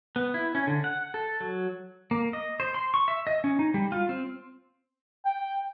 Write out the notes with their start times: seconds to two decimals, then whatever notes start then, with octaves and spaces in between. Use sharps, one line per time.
0.16 B3
0.34 E4
0.55 C#4
0.67 D3
0.84 F#5
1.14 A4
1.41 F#3
2.11 A#3
2.33 D#5
2.60 C5
2.74 C6
2.94 C#6
3.08 E5
3.27 D#5
3.44 C#4
3.59 D#4
3.74 G3
3.92 F4
4.09 C4
5.26 G5